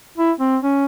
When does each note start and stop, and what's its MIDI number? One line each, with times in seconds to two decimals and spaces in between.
0.18 0.32 64
0.40 0.57 60
0.63 0.86 61